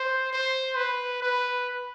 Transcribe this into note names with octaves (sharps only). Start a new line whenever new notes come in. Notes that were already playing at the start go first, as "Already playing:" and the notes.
Already playing: C5
C5
B4
B4